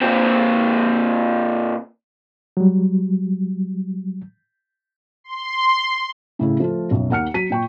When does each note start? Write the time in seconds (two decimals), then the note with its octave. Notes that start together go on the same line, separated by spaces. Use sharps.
0.02 A#2 C4
2.57 F#3 G3
5.24 C6
6.39 A2 C#3 E4
6.60 F3 A3 F4
6.91 B1 F#2
7.10 D#2 A#3 F#5 F6 C#7
7.34 F#3 B6 D#7
7.50 A#2 G5 C#6